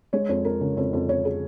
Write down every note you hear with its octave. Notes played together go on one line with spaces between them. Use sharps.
G#3 C#5
F2 C#5
F2 A#4
C#3
F2 C#5
F2
F2 C#5
G#4